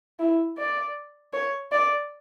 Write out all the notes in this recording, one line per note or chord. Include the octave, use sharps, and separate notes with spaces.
E4
D5
C#5
D5